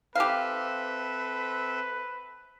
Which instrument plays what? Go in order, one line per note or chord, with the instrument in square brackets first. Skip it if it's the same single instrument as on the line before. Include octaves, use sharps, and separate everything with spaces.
[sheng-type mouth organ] C4 A4 E5 [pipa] G4 F5 [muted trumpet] B4